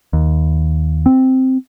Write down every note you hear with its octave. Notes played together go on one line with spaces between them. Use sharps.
D#2
C4